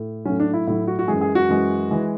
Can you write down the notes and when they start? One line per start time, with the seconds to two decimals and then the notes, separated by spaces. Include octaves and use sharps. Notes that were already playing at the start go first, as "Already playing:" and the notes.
Already playing: A2
0.25 A2 F#3 C#4
0.40 D4
0.54 E4
0.67 A2 F#3 E4
0.88 F#4
0.99 F#4
1.08 F#2 E3 G#3 G#4
1.21 G#4
1.35 F#4
1.49 F#2 E3 G#3
1.91 E3 G#3